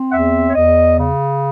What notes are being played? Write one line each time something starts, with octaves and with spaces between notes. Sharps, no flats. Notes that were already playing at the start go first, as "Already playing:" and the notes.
Already playing: C4
F#5
E2 E5
C#5
E2 D#5
C#3